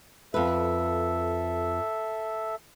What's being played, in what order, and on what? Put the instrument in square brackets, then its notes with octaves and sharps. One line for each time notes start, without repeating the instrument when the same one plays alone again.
[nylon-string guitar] F2 B4 [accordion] A4 E5